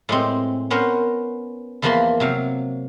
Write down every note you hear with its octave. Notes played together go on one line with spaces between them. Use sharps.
A2 G#3 C4
B3 C#4 A#4 C5
E2 E3 F3 A#3 B5 C6
C3 F#3 F5